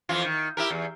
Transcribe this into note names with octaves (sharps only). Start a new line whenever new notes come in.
F2 E3 F4
D#3
E4 G4 A#4
E2